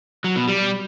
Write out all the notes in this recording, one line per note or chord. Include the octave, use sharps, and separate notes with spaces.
F#3
B2
G3